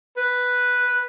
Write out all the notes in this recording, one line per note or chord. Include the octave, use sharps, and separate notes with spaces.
B4